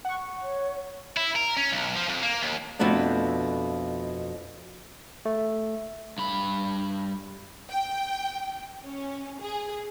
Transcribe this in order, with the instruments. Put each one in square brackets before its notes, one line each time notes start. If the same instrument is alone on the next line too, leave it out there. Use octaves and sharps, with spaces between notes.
[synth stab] F#5 C#6
[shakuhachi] C#5
[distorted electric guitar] E4
A#4
C#4
B1
F3
F2
A#3
D#2
[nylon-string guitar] F2 B2 A3 B3 D4
[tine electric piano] A3
[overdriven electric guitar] G2 B5
[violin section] G5
C#4
G#4